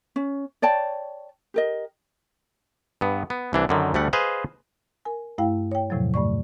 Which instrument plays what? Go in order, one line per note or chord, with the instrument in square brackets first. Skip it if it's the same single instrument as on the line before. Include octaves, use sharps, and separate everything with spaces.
[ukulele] C#4
C#5 D5 G5 A5
G4 A#4 D#5
[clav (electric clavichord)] G2 B3
B3
C2 E3 D4
F#2 D3 D#3
D2 G3 A3 F#5
G#4 B4 C5 D#5 F5
[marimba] A#4 G#5
G2 A3 E4 F5 G5
C#5 G5
E2 A2 C3 F3 F#3
G2 A3 D5 C#6